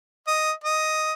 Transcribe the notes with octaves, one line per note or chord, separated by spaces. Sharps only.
D#5
D#5